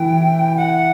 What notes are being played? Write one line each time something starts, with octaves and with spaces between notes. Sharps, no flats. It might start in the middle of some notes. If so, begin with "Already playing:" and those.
Already playing: E3 G5
F#5